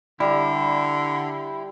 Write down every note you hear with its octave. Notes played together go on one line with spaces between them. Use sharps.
D3 G3 E4